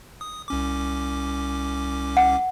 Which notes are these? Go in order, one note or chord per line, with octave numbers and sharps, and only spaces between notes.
D#6
C2 C#4 D6
F#5